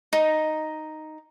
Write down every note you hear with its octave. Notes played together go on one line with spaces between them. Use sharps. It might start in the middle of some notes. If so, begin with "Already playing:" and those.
D#4